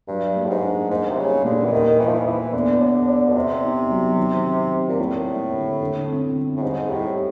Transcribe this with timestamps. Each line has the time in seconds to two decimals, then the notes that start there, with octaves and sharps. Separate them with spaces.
0.08 G2 F#3
0.36 A#3
0.45 A2
0.50 G#2
0.63 D4
0.90 G#2 A#3
1.09 C3
1.17 C#3 G3
1.44 A#2 D3
1.65 E3
1.72 D#3 C5
1.99 E3 C5
2.07 F3
2.13 E3
2.26 E3 C5
2.53 D3 B3
2.81 D5
3.08 D5
3.29 B2
3.35 C3 B3
3.62 D#4
3.90 F#3
4.17 D#3
4.45 C4
4.72 C4
4.88 A#2
4.99 A2 A#3
5.26 G3
5.53 D3
5.81 D3
6.08 C4
6.36 D3
6.56 A2
6.62 G#2 G3
6.89 A2 G3